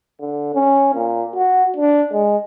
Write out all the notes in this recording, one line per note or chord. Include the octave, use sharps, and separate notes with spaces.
D3
C#4
A#2
F#4
D4
G#3